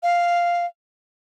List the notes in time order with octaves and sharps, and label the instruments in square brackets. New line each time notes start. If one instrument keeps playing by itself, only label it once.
[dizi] F5